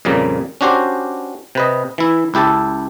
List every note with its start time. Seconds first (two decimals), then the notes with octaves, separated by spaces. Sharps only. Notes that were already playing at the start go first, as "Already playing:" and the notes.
0.05 F2 A#2 C#3 G3 A#3
0.61 C#4 D4 F#4 G4 C5
1.55 C3 B4 D#5
1.98 E3 E4
2.34 C#2 E4 G4 A4 A5